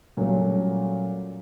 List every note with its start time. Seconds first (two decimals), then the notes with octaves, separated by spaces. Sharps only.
0.17 A#2 F#3 G3 A3 C#4 A4